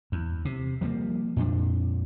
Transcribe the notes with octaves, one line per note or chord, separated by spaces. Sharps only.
E2
C3
F3 G3 G#3 A#3
F2 A#2 D4